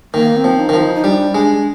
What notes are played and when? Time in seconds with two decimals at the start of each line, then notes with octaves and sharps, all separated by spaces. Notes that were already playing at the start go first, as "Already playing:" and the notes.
0.14 D#3 A#3
0.37 C4
0.44 F3
0.60 D#4
0.69 D#3
0.73 F3 F4
0.81 D#4
0.95 D#4
1.04 G3 D4
1.35 G#3 D4